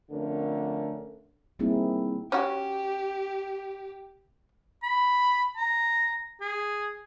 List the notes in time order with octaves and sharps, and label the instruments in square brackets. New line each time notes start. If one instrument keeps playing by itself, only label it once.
[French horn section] F2 D3 A3 C#4 A#4
[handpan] G3 A#3 C4 D#4 E4 G#4
[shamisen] C#4 F#4 [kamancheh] G4
[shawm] B5
A#5
G#4